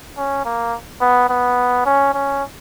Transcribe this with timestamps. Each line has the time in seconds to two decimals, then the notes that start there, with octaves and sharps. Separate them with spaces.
0.17 C#4
0.45 A#3
1.01 B3
1.29 B3
1.85 C#4
2.13 C#4